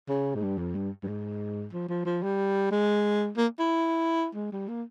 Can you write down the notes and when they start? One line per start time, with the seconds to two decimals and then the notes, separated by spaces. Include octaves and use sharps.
0.09 C#3
0.35 G#2
0.42 G2
0.58 F2
0.75 G2
1.03 G2
1.08 G#2
1.73 F3
1.89 F3
2.05 F3
2.23 G3
2.71 G#3
3.37 A#3
3.59 E4
4.35 G#3
4.52 G3
4.68 A#3